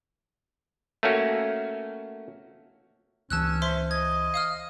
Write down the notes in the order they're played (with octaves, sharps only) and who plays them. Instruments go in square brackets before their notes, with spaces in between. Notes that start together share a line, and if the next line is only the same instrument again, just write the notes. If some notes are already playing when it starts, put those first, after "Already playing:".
[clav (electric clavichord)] A3 A#3 C#4 F#4
[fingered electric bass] C#2 E3 [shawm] C#4 [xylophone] A5 E6 F#6
[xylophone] C5 E5 C6
[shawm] D#5 [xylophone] G#6
[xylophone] F5 D#6 F6